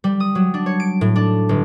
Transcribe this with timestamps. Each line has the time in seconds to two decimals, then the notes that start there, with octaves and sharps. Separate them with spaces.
0.04 G3
0.20 D#6
0.35 F#3
0.54 D4
0.66 C#5
0.80 D7
1.01 A2
1.16 D4
1.49 G1